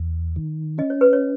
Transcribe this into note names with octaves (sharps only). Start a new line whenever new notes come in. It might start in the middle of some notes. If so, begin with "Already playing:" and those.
Already playing: E2
D#3
C#4 D#5
C#5
B4
C#5